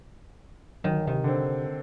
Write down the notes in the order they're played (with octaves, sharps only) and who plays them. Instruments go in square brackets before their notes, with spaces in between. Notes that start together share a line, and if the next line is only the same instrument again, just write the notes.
[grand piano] D1 [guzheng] D#3 [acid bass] F#3
[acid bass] C3 [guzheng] D#3
[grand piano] D3 C4